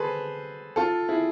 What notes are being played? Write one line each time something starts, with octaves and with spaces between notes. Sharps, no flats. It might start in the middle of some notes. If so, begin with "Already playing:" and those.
Already playing: G#4 A4 B4 C5
F4 A4
E4 G#4